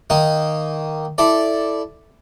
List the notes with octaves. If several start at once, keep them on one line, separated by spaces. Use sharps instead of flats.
D#3 A#3 D#4
E4 A4 D5